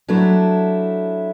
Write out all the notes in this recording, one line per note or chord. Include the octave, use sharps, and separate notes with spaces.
F#3 A3 D4 E4